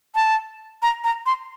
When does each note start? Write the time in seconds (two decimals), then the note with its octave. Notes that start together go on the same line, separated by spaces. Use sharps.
0.15 A5
0.82 A#5
1.04 A#5
1.26 C6